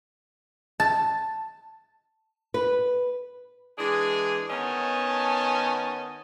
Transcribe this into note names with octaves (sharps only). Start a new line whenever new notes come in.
A5
B4
E3 G#3 D4 G#4
D#3 B3 C#4 D#5 G#5 A5